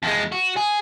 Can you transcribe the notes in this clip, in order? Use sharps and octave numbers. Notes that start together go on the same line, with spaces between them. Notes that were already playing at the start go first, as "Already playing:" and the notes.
F2 G#3
F#4
G#4